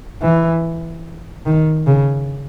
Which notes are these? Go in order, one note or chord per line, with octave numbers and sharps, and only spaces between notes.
E3
D#3
C#3